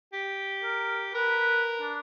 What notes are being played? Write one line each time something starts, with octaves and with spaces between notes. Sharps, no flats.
G4
A#4
A#4 B4
D4